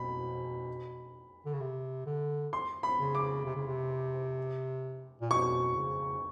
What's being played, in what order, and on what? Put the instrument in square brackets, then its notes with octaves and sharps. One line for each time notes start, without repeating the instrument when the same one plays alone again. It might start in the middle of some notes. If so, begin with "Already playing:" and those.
Already playing: [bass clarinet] B2 [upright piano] B5
[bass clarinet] D3
C#3
C3
D3
[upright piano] C6
B5
[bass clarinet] C#3
[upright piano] D6
[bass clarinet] C3
C#3
C3
A#2
[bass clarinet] B2 [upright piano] C#6
[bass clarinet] C#3